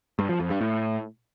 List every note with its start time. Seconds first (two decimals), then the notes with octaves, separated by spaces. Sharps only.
0.19 G2
0.29 F3
0.40 F2
0.50 G2
0.61 A2